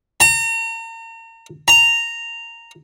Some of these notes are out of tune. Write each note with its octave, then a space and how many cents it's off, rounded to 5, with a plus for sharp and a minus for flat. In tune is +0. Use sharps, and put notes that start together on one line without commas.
A#5 -40
A#5 -10